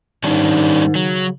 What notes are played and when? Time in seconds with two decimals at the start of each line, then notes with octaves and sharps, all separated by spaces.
0.24 G#2 D#3 G3 C#4 D4
0.95 C#3 F#3